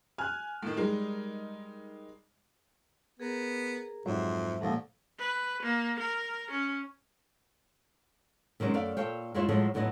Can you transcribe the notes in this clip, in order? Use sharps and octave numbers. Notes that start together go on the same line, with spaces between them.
G#5 F6 F#6
A2 D#3
G3 G#3 D#4 G#4 A#4
B3 G#4 A#4 A#5
F2 G#2 F#3 C5 E5
D#2 A#2 F3 A3 F#5
B4
A#3
A#4
C#4
C3 D#3 F#3 G#3 C#4
F#2 A3 D5 F5
A#2 A4 C#5 F5 G5
F#2 G#3 E4 F4 C5 C#5
A2 F3 F#3 G#3 A3
F2 A2 F#3 B3 E4 D#5